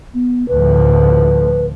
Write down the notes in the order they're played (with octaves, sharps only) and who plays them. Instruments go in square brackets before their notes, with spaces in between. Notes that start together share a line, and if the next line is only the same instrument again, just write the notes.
[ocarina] B3
[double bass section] D2 A2 F3 [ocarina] B4